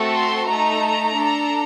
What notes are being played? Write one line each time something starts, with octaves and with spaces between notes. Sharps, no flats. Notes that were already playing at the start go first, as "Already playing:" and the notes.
Already playing: A3 C4 F#4 A4
C6
A3 D#4 A4 A#5
D4 A4